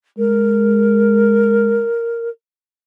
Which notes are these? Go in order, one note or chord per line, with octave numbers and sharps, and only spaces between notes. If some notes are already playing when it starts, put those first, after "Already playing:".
G#3 A#4